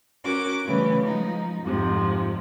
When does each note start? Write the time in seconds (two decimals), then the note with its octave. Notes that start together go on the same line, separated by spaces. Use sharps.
0.24 C#4 F#4 A#4 D6
0.64 C#3 E3 G3 A3 B3 C#4
1.01 F3 G#3 D#4
1.63 F2 G#2 C3 F3